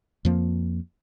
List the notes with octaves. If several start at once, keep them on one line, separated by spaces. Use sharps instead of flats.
F2 F3 A#3